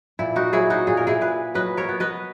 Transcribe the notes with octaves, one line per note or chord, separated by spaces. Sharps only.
A#2 E4
D#4 F#4
F#3 E4 G#4
D#4 F#4
A#2 G#4
A#4
E4 G#4
A#2 G#4 B4
F#3 B4 D#5
A#4 C#5
B3
B4 D#5